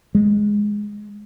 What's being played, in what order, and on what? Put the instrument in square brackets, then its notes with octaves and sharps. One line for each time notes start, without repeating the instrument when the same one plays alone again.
[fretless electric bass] G#3